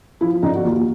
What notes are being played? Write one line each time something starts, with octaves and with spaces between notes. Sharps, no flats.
F3 E4
D3 D#4
F#4
D#2 F4